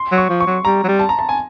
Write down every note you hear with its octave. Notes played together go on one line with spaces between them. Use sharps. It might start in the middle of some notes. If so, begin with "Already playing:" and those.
Already playing: C6
F#3
C#6
F3
C#6
F#3
G3 A#5
F#3
G3
A5
A#5
A5
G#5